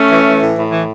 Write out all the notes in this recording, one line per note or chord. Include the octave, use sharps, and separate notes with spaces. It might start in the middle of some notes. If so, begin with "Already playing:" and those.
Already playing: A3 C#4
E3
E3
A2
A2
E3